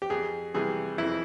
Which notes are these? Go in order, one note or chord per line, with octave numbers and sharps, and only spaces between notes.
G4
F2 G#4
C3 E3 G3 G#4
F2 E4